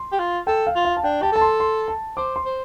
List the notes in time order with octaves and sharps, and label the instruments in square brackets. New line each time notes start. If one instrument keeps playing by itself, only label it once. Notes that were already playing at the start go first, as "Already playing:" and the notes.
Already playing: [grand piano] C6
[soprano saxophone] G4
F4
[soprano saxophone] A4 [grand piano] G5
[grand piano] F5
[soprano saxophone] F4
[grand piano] F5
A5
[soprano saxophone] D4 [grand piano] G5
[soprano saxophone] G4 [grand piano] A5
[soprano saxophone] A4 [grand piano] A5
[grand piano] C6
C6
A5
[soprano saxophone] C5 [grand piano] D6
[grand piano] C6
[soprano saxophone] C5